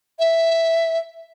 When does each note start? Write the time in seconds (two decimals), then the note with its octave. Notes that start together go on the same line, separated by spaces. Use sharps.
0.19 E5